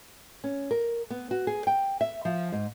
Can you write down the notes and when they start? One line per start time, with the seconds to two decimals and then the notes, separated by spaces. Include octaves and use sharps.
0.44 C#4
0.71 A#4
1.10 B3
1.31 F#4
1.47 G#4
1.67 G5
2.01 E5
2.25 F3
2.52 G#2